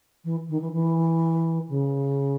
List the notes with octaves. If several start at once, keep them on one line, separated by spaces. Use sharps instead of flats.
E3
D#3
E3
E3
C#3